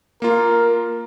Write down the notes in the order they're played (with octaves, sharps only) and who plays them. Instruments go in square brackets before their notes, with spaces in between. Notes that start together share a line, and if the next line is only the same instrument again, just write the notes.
[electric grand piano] A#3 F4 [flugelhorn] A#4